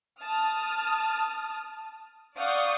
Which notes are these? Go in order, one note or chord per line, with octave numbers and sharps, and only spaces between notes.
A5 D#6 F6
D5 F5 F#5 C#6 D#6 G6